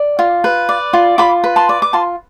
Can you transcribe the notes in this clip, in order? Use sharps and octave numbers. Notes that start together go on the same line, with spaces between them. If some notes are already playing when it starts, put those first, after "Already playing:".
Already playing: D5
F4
B4
D5
F4
F4 B5 D6
B4
A5 C6
D5
D6
F4 A5 C6